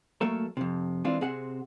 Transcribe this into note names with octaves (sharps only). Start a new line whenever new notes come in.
F#3 A3 A#3 A4 A#4
F2 C3
E3 G#3 C4 D4 F4
C3 C4 G#4 F#5